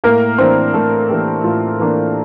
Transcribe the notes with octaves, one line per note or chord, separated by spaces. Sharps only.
A2 A#3 A#4
E3 A#3 C4 D4 C5
A2 A3 A4
E3 A#3 D4 G4
A2 F4
E3 A#3 D4